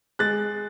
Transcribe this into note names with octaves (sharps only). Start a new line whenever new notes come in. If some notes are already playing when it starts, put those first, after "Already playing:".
G#3 F#6 A6